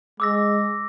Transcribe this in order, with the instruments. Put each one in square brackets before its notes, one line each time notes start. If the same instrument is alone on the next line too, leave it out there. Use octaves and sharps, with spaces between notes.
[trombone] G#3 [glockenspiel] D6 E6 A#6